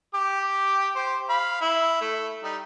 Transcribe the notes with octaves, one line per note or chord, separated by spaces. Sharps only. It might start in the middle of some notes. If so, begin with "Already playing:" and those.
G4 D6
G4 C5
F5 B5
E4
A3
G3 D#4